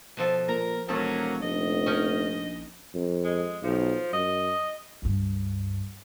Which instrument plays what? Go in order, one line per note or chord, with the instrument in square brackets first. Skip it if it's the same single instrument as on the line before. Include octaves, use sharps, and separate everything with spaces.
[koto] B2 F3 A4
[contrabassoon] A#2 [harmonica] A#4 [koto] A#5
[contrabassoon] E1 [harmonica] F#3 A#3 C#4 [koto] A4
[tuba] F1 [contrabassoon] A#1 [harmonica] D#5
[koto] C#4 D#4 A#4
[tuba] F2
[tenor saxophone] G#3
[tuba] B1 [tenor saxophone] F3
[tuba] F#2 [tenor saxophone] D#5
[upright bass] C#2 G2